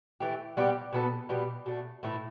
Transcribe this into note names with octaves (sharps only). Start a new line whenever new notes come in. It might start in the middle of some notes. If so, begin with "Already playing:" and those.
E3 A3 G4
G3 B3 E4 G4
B2 B3 D4 A4
B2 G3 B3 G4
B2 A3 D4
A2 E3 A3 E4